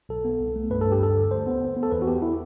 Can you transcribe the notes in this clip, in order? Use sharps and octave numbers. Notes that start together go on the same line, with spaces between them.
B1 A4
B3
C2
A3
G2 B4
G2 A4
G4
D2 A4
D2
D2 C5
B3
D2
B3
A4
E2 B4
F#4
B3 G4
E4